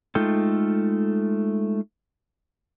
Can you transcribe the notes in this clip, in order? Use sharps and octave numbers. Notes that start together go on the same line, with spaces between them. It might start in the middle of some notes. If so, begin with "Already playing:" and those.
G#3 A3 D#4 F4 A4 G5